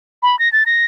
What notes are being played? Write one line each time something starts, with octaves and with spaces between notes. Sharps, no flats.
B5
A#6
A6
A#6